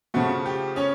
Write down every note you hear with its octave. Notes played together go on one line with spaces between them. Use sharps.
C#3 F3 A3 F#4
G4
C#4 C#5